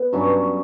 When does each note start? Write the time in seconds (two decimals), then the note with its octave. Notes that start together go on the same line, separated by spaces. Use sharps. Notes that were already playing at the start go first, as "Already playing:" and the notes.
Already playing: B3
0.13 G2 F#3 C#4